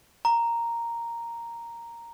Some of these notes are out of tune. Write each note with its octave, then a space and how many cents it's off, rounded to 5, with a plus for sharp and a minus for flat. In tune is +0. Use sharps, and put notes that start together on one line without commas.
A#5 -5